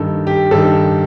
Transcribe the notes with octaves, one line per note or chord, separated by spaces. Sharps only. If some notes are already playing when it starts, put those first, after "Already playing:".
Already playing: G2 D#3 A4
G4
G2 D#3 A4